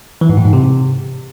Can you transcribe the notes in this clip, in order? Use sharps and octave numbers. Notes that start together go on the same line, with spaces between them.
E3
G#2
A2
G#2
C3